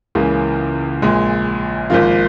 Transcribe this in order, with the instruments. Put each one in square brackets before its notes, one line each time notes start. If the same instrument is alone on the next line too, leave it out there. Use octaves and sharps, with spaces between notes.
[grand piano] C#2 C#3 E3 A#3
A#1 A#2 G#3
G#1 G#2 F3 A#3 F4